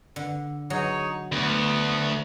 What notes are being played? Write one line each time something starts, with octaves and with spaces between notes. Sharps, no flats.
D3
F#3 D#4 G#4 C#5
D2 B3